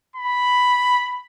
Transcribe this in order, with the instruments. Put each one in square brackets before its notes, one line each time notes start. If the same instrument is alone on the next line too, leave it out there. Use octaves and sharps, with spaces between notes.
[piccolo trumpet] B5